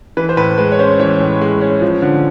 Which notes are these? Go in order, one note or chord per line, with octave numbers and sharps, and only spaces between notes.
E3 B4
C5
A2 B4
G#3 B4
C#5
C#4 C5
E3 C#5
A2
G#3
C#4
F3
D3